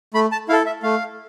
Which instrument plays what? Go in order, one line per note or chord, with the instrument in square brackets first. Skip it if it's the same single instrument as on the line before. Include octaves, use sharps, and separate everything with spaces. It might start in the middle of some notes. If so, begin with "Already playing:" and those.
[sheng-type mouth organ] A3 B5
A5
E4 F5
A4
E5
A3 F5